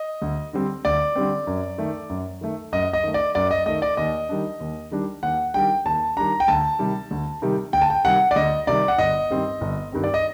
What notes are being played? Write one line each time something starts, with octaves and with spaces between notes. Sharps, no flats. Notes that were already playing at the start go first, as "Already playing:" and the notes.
Already playing: D#5
D2
D3 G3 C4
D2 D5
D3 G3 C4
F#2
D#3 A3
F#2
D#3 A3
F#2 D#5
D#5
D#3 A3
D5
F#2 D5
D#5
D#3 A3 D#5
D5
D#2 D#5
D#3 G3 D4
D#2
D#3 G3 D4
D#2 F#5
D#3 G3 D4 G5
D#2 A5
D#3 G3 D4 A#5
G5
D2 A5
C3 D#3 G3
D2
C3 D#3 G3
D2 G5
A5
G5
C3 D#3 G3 F#5
D5
D2 D#5
C3 D#3 G3 D5
F#5
G1 D#5
G2 D#3 G3 C4
G1
G2 D#3 G3 C4
D5
D#5